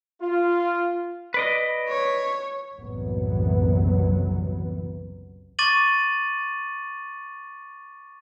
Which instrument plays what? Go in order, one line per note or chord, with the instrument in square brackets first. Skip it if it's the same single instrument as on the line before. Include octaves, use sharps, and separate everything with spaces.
[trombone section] F4
[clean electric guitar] B4 D5 D#5
[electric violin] C#5
[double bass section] F#1 C2 A2 E3 F#3 B3
[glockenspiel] C#6 D6 A6 D#7 F#7